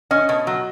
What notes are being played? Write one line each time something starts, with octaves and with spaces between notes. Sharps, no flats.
C#4 D#5
B2
F#3